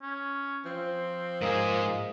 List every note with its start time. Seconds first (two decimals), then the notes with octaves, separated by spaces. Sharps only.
0.02 C#4
0.65 F3 C4
1.42 G#2 A#3 G#4 D#5